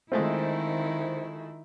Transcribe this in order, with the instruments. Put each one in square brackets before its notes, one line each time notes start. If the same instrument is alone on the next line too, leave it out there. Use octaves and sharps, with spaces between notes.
[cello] D#3 E4 [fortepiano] G#3 A3 F4 [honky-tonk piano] C4